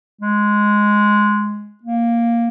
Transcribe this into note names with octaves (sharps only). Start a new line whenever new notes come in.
G#3
A#3